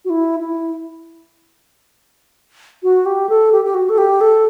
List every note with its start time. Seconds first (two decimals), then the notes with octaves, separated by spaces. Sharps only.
0.05 F#4
0.10 E4
0.40 E4
2.83 F#4
3.06 G4
3.29 A4
3.52 G4
3.65 G4
3.74 F#4
3.89 A4
3.98 G4
4.21 A4